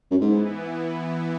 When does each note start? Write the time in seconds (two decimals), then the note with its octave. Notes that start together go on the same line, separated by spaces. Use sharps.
0.11 F#2
0.21 G#2 E3 B3 E4